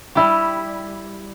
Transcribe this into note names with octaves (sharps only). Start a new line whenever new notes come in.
G3 E4 G4